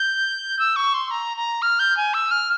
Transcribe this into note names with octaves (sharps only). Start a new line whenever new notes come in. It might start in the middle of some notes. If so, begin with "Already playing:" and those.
Already playing: G6
E6
C#6
C6
A#5
A#5
F6
G6
G#5
E6
F6